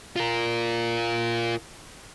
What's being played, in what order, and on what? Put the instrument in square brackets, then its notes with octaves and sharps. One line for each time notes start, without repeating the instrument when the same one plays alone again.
[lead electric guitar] F4 A#4